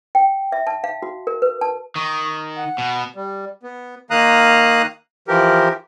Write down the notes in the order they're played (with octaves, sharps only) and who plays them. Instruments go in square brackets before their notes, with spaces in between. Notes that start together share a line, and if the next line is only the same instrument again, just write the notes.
[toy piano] G5
E5
A5
F5
F#4
A#4
B4
A5
[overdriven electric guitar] D#3 [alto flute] C#6
[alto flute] F#5
[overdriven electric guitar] B2
[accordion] G3
B3
D#3 A#3 F5 A#5 D#6 F#6
E3 F3 G4 A#4